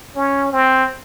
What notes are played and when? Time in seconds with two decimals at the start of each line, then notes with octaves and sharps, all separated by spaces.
0.16 C#4
0.53 C4